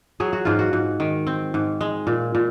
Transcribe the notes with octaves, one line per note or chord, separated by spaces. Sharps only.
F#3 G#4
F#4
G#2 F4
F#4
G#2
D#3
C4
G#2
G#3
A#2
A#2